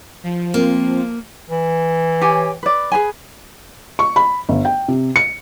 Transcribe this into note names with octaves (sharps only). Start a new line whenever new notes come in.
F3
A#3 C4
E3
G4 C#5 G#5
B4 D5
G#4 B4 G#5
C#6
B5
G1
G5
C3
C#7